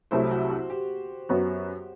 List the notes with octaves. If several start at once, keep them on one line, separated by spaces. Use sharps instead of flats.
C2 C3 F#3 A3 E4 C5
F#4
F#4
G4
F#2 F#3 B3 F#4